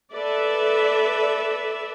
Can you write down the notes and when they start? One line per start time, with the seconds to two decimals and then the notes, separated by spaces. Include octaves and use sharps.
0.14 A4 B4 D5 E5